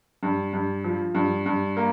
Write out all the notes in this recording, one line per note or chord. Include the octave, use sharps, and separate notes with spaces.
G2
G2
F3
G2
G2
A#3